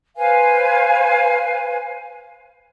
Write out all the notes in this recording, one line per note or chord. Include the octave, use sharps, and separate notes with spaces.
B4 C5 F5 G#5